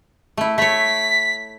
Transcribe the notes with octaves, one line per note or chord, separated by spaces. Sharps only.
A3 E4
A3 C#5 B6